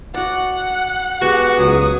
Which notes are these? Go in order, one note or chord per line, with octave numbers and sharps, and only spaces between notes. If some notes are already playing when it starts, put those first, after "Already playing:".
F#4 D5 F#5
G#3 B3 F#4 G4
C#2 F#3 D#6